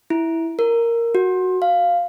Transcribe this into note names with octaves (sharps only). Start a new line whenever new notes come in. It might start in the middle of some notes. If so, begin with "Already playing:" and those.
E4
A#4
F#4
F5